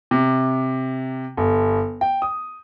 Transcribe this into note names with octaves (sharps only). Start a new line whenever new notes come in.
C3
G1
G5
D#6